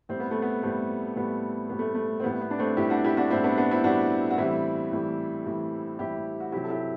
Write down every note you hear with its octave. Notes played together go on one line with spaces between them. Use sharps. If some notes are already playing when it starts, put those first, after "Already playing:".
A2 G3 C4
B3
A3
B3
A2 G3 A3 C4
A2 G3 B3
A2 G3 B3
A3
A3
C4
A2 G3 B3
B3
D4
A3 C4
A2 G3 E4 G4
D4 F#4
E4 G4
D4 F#4
A2 G3 C4 E4
B3 D4
B3 D4
C4 E4
A2 G3 D4 F#4
F#4
A2 E3 G3 C4 E4
A2 E3 G3
A2 E3 G3
A2 E3 G3 E4 G4
F#4
C3 F#3 E4 G4
A4
E4 G4